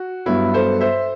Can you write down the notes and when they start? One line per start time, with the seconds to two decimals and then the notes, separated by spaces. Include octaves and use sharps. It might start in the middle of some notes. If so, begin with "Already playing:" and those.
Already playing: F#4
0.26 G2 F#3 B3 E4
0.54 A4 C5
0.80 C5 E5